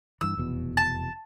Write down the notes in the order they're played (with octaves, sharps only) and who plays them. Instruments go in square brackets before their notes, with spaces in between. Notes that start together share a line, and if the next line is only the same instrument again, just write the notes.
[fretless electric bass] G2 E3 [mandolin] E6
[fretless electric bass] F1 E2 B2
[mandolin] A5